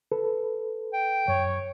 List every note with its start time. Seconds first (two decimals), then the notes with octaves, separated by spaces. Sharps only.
0.12 A4 B4
0.93 G5
1.28 F#2 C#5